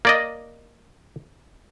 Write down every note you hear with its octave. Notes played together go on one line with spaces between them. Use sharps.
A#3 D5 D#5